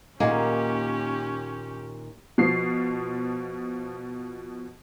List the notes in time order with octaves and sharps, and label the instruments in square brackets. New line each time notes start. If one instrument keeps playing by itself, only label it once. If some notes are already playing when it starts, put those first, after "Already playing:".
[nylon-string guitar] D#2 A#2 F#5 [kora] A#3 D#4 G#4 [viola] C#4 G4
[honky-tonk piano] B2 F3 C7